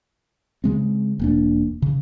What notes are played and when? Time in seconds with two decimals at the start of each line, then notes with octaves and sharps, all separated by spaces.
0.64 C#3 G#3 C4
1.19 E1 A#3 D4
1.82 C#3